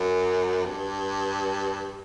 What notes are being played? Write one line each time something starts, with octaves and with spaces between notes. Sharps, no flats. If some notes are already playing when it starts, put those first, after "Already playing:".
Already playing: F#2
G2